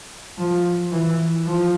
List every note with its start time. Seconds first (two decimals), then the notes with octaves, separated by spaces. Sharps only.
0.38 F3
0.92 E3
1.46 F3